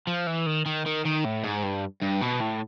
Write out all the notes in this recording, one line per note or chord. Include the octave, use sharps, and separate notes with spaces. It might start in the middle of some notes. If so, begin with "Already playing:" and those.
F3
E3
D#3
D#3
D#3
D#3
A2
G#2
G2
G2
B2
A2